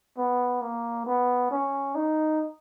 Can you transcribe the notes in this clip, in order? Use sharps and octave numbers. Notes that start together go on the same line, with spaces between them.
B3
A#3
B3
C#4
D#4